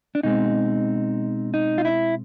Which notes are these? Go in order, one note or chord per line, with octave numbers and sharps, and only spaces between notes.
D4
B2 G#3 C4 D#4
D#4
F4
E4